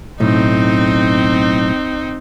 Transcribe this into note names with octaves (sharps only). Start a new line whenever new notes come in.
B1 A2 C4 D#4